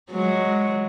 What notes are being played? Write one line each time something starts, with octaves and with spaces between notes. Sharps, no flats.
F#3 G#3